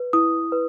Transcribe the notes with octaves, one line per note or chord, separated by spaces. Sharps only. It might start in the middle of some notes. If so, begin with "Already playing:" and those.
Already playing: B4
E4 D#6
B4